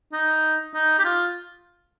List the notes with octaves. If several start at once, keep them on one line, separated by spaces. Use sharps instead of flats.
D#4
D#4
G4
F4